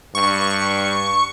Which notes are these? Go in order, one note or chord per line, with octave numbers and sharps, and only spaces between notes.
G2 C#6